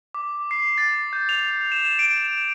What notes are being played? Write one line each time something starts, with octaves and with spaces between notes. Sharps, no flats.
D6
C7
A6
G6
F7
E7
D7
E7